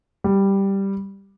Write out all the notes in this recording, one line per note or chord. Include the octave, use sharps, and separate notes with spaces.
G3